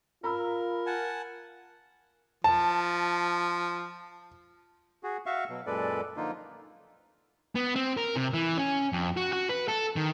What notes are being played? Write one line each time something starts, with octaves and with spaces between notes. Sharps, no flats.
F4 A#4 A#5 B5 E6
F#5 G#5 A5
F3 A5
F#4 G#4
F#4 E5 F5 C#6
B2 F#3
F#2 A#2 G#3 A4 B4 D5
D3 F3 A#3 D#4 F4
B3
C4
A#4
C3
E3
C#4
F2
F#4
F#4
B4
A4
D#3